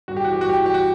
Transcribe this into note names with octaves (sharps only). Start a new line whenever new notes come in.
G2 F#4
G4
E3 F#4
G4
G2 F#4
G4
E3 F#4
G4
F#4